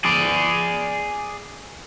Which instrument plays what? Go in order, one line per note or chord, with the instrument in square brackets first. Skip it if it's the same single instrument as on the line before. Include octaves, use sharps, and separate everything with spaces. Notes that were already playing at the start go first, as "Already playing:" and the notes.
[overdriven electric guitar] G#4 D5